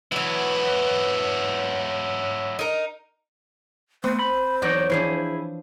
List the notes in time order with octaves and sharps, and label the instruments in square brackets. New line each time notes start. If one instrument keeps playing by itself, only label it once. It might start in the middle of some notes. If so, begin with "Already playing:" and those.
[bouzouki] E3 B3 [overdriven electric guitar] F#3 E4
[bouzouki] D#4 A#4
[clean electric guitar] A3 B3 [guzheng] C4 [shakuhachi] C5
[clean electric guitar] B5
[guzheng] E2 F#3 C#5 [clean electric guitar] D#4 A#4 D5
[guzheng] E3 F3 D4 [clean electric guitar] E4 G#4